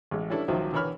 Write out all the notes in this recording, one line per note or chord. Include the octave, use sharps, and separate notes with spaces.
A1 G#3
G3 C#4 D4 E4 A4
C#2 D#3 F3 F#3 C5 E5
D3 E3 A#4 C#5 B5 F6